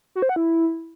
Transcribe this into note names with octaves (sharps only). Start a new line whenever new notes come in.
F#4
C5
F#5
E4